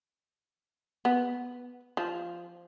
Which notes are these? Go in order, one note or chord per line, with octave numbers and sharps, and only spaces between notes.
B3
F3